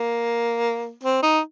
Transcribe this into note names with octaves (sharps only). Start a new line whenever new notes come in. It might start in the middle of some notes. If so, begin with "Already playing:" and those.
Already playing: A#3
C4
D#4